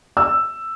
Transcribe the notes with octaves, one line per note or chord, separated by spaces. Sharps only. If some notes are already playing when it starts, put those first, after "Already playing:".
E6